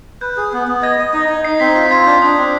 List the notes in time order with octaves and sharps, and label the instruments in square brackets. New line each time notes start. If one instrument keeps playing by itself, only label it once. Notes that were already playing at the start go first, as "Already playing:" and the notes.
[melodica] B4 [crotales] G6
[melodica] G#4
B3
B3
[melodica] D#5 [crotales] G#6
[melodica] D#5
D#4
D#4
[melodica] D#4 [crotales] C7
[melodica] C4 [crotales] B6
[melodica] F4
[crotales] B6
[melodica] F4 [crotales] G#6
[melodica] D4 [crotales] G6
[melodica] D4 [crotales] D#6
[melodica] C4 [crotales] D#6